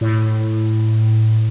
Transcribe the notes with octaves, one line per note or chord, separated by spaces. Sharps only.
A2